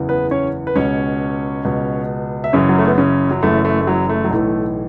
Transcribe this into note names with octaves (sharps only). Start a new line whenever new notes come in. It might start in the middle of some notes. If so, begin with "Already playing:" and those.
Already playing: F#1 E2 C#3 E3
B3 B4
C#4 C#5
B4
C#2 B2 C#4 C#5
C#2 B2
E5
F#1 F#2 C#3 E3 C#4 C#5
F#3
A3
B3
C#3 C#4
F#3
F#1 F#2 C#3 E3 A3
A3
A3
F#3
A3
F#3
B1 A2 E3 A3